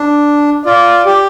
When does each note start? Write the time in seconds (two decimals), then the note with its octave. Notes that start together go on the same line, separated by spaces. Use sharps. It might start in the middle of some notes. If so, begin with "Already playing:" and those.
Already playing: D4
0.66 F4 D5
1.06 G4